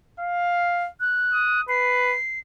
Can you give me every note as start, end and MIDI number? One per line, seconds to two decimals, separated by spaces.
0.20 0.88 77
1.00 1.61 90
1.34 1.61 87
1.69 2.16 71
1.69 2.39 96